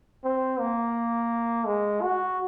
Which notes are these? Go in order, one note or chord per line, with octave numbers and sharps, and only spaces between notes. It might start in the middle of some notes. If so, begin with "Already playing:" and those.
C4
A#3
G#3
F#4